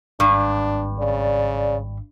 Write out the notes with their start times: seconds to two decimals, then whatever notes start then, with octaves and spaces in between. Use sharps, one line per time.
0.20 G#1 G2 D4
0.98 C#3 D5